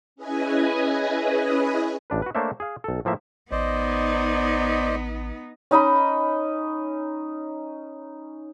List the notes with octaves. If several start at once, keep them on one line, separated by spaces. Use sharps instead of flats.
C#4 E4 G#4 B4 D#5 G#5
A1 D4 B4
F#4 B4
A3 A#3 D4 C5 C#5 E5
G#4 F5
B1 A4
A2 F3 A#3 E5
A1 B3 D#4 C5 D5 D#5
C#4 D#4 D#5 B5